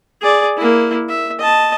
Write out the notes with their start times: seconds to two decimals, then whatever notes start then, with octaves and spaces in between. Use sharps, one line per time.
0.22 G#4 D5
0.57 A#3 E4
1.09 E5
1.39 D#5 A5